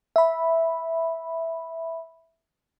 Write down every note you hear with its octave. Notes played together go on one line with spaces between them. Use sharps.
E5 B5